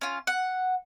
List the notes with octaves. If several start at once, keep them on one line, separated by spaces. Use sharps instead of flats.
C#4 F4
F#5